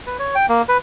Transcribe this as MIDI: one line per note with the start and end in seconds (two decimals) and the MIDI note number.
0.07 0.17 71
0.19 0.35 73
0.35 0.46 79
0.49 0.62 58
0.69 0.78 71